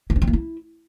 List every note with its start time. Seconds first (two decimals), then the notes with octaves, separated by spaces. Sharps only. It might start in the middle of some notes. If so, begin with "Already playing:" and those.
0.10 C#4
0.16 D4
0.22 C4
0.27 A#3
0.33 E4